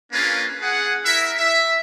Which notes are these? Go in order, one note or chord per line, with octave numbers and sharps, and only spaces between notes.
A#3 C#4 D4 F4 G#4 B4
G#4 F#5
E4 A#4 E5
E5